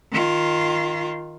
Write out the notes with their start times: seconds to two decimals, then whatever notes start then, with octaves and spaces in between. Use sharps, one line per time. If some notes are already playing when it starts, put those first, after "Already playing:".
0.12 D#3 F4